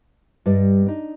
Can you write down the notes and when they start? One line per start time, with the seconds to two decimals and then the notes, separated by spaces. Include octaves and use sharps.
0.46 G2 G3 D5 D#5
0.87 D4 D#4